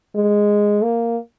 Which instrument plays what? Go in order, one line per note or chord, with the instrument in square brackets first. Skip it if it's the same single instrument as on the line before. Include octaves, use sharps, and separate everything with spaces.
[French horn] G#3
A#3